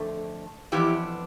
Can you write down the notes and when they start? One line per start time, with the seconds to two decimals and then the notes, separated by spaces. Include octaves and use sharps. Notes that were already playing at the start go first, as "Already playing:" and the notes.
Already playing: F2 D3 A3
0.72 F2 E3 B3 D4 E4 G4